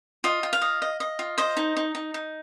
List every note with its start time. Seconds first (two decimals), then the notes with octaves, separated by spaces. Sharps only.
0.24 F4 D#5
0.43 F4
0.53 F5
0.62 D#5
0.82 D#5
1.00 D#5
1.19 F4
1.38 C5 D#5
1.57 D#4
1.77 D#4
1.95 D#4
2.14 D#4